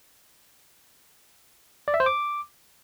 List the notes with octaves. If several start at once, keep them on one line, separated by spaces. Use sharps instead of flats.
D5
E5
C5
D6